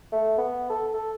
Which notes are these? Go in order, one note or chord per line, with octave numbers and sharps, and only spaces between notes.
A3
B3
A4
A4